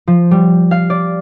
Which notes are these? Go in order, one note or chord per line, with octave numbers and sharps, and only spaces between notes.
F3
G3
F5
D5